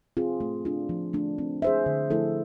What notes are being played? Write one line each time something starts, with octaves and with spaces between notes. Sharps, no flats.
C4 F4 G#4
A3
D4 F4
F3
A3 D4
C4
G#4 C5 E5
D3
F3 A3 E4 A4